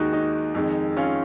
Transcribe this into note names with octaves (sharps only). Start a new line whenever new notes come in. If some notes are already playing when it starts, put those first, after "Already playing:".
Already playing: D#2 D#3 G#3 D#4 F#4
D#4
F2 D#3 G#3
C#4 F4